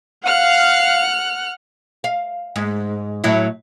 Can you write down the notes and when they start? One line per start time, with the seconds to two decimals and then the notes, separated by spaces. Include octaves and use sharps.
0.25 F5 F#5 F6 F#6
2.04 F5
2.56 G#2
3.24 A2 F#3 E4